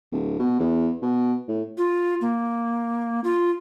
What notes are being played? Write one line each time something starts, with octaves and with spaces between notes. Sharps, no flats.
D1
B2
E2
B2
A2
F4
A#3
F4